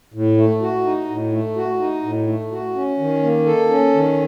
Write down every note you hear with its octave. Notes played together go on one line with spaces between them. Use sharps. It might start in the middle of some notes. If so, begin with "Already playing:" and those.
A2
A3
F#4
D#4
A2
A3
F#4
D#4
A2
A3
F#4
C#4
D#3
A#3
A4
C#4
D#3